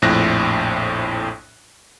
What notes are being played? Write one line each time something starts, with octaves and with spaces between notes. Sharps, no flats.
A#1 F2 A2 F#6 A#6